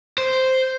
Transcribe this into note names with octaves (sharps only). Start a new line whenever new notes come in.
C5